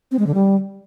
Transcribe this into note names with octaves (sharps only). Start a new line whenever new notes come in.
C4
G#3
D3
G3